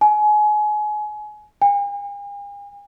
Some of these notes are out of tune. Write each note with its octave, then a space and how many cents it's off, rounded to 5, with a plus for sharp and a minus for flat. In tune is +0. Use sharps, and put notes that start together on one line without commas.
G#5 +25
G#5 -45